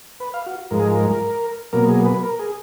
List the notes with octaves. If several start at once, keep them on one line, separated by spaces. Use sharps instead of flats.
B4
F5
F#4
G#2 F3 G#3 A#4
G#4
A#4
B2 F#3 A#3 A#4
G#4
B4
A#4
G#4